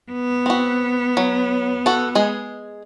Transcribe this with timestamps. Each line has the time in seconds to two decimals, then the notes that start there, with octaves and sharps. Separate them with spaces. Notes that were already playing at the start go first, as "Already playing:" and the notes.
0.11 B3
0.46 C4 F#4
1.17 F#3
1.86 F#4 A4
2.15 G#3 G#4